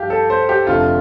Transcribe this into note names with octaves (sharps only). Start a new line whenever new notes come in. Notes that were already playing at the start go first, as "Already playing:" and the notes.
Already playing: G2 F3 G4 F5
A4
C5
G4
F1 F2 D3 A3 F4